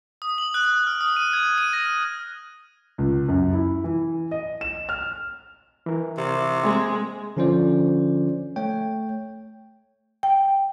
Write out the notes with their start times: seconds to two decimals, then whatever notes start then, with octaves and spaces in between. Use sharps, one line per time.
0.22 D#6
0.38 F#7
0.54 F#6
0.71 F#6
0.87 F6
1.01 D#6
1.16 D#7
1.33 G#6
1.58 D#7
1.73 A#6
1.86 F6
2.98 C#2
3.28 F#2
3.53 E4
3.84 E3
4.31 D#5
4.61 E7
4.89 F6
5.86 E3 A#4
6.18 C3
6.64 G#3 A#3 C4
7.37 D3 F3 C#4 F4 C5 D5
8.56 A3 C#5 G5
10.23 G5